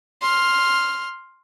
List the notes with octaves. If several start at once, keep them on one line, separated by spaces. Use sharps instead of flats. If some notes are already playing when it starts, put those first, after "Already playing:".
C6 F6